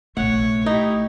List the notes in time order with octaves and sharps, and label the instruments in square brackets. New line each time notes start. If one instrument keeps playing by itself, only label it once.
[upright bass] A#1 C3 [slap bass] A3 [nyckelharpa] C#5 C#6 [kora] F#5
[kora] D#4 [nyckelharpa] E4 G4